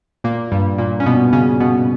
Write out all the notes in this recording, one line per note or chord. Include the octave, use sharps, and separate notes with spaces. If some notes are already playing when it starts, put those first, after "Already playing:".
A#2 A#3
G2 G3
A#2 A#3
C#4
B2 B3
C#3 C#4
B2 B3